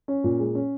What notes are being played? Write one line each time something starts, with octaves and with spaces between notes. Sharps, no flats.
C#4
A#2
G#3
C#4